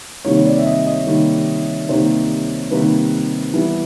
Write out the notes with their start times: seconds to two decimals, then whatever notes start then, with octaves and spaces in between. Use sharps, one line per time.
0.24 C3 D#3 G3 A#3 C#5
0.45 D5
0.58 E5
0.66 D#5
0.86 D#5
1.07 C3 D#3 G3 A#3
1.89 C3 D#3 G3 A#3 C5
2.71 C3 D#3 G3 A#3 B4
3.53 E3 G3 B3